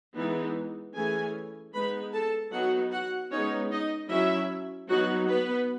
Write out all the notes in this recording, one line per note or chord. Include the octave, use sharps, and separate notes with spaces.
E3 G#3 B3 D#4
E3 A3 C#4 G#4 G#5
G#3 B3 D#4 B4 B5
A4 A5
F#3 B3 D#4 F#4 F#5
F#4 F#5
G#3 B3 C#4 D#4 C#5
D#4 D#5
F#3 C#4 E4 E5
F#3 B3 D#4 F#4 F#5
B3 B4